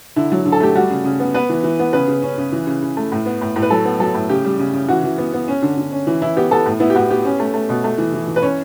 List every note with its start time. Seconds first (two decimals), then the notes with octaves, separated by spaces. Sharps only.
0.16 D3 E4
0.32 F#3
0.45 D3
0.52 A4
0.60 A3 G4
0.76 G3 F#4
0.90 C#3
1.04 C#3
1.20 B3
1.34 B3 B4
1.49 E3
1.63 E3
1.79 B3
1.93 C#3 B4
2.08 C#3
2.22 C#4
2.38 C#3
2.52 E3
2.67 C#3
2.83 C#3
2.97 A3
3.12 A2
3.26 B3
3.42 A2
3.56 A2
3.62 B4
3.70 F#3 A4
3.85 B3
4.00 F#3 A4
4.15 A2
4.29 C#3 G4
4.45 G3
4.59 C#3
4.74 C#3
4.88 E3 F#4
5.04 E3
5.18 B3
5.34 B3
5.48 C#4
5.62 D3
5.77 D3
5.92 C#4
6.07 E3
6.21 E3 E4
6.37 B3 G4
6.51 B3 A4
6.66 A2
6.80 B3 E4
6.90 G4
6.95 A2 F#4
7.10 B3 G4
7.25 C#4
7.40 A3
7.54 A3
7.69 B2
7.84 A3
7.98 E3
8.14 E3
8.28 E3
8.36 B4
8.42 C#4 C#5